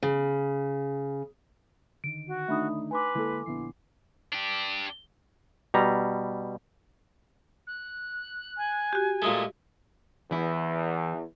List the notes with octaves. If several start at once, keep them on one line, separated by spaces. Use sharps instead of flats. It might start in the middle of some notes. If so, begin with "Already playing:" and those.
C#3
D3 D#3 D7
F#4
A3 D4 D#4 E5 B5 D#6
B4 G#5 C6 D6
D3 G#3 A#3 E4 A4
A#1 D3 F3 B3 E4 C7
D4 G4
B2 G3 A#5
F#6
G#5
F#4 G4
A#2 G#3 A3 D#6
E2 E3 E4